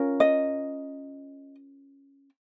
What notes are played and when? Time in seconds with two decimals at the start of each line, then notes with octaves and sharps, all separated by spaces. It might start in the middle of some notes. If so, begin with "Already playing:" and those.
Already playing: C#4 F4 A#4
0.20 D#5